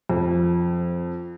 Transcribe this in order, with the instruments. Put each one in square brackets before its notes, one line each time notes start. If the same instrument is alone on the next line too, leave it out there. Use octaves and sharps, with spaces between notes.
[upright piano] F2